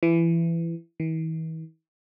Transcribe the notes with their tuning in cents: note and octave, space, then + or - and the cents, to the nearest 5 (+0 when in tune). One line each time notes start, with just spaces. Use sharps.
E3 +20
E3 -45